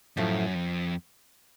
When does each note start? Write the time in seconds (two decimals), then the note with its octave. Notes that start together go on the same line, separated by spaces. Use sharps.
0.17 F#2 A2 F3 A3
0.55 F2